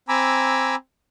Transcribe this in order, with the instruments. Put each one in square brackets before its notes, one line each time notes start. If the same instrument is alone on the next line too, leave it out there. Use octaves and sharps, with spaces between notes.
[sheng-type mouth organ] C4 G#5 A#5 B5 D6 E6